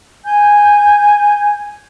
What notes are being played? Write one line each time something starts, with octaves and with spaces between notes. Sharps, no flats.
G#5 G6